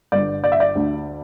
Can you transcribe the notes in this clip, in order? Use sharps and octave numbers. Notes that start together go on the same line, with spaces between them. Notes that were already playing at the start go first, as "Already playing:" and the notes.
G1 G2 D3 D5
D5
E5
D5
D2 D3